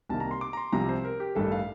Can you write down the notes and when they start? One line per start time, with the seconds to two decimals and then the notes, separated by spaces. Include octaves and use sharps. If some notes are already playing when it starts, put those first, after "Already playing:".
0.10 C2 C3 D#3 A#3 A5
0.20 A#5
0.31 C6
0.41 D6
0.53 A#5
0.57 C6
0.72 C2 C3 F3 A#5
0.89 C5
1.05 A#4
1.20 G4
1.35 A1 G2 D#3 A3 A4
1.52 F5